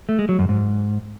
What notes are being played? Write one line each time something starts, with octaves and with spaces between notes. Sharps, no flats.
A3
G#3
F#3
F#2
G#2